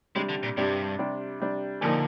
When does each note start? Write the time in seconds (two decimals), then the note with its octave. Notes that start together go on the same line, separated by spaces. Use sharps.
0.15 C3 G3 G#3 D4
0.29 D3
0.43 A#2
0.57 G2 C3 G3 D4
0.99 C3 G3 D4
1.40 C3 G3 D4
1.81 A#2 D3 F3 A#3 D#4